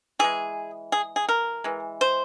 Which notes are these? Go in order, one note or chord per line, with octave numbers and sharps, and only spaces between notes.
E3 G#3 G#4
G#4
G#4
A#4
E3 G#3
C5